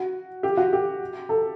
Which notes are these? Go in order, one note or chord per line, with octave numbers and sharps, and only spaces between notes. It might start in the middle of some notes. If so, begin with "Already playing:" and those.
Already playing: F#4
G4
F#4
G4
A4